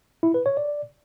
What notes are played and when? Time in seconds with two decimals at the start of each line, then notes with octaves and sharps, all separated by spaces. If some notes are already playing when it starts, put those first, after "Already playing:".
0.23 E4
0.34 B4
0.46 C#5
0.57 D5